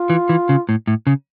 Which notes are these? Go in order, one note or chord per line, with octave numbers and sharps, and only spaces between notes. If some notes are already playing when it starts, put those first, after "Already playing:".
Already playing: F4
E3
E3
C#3
A2
A2
C#3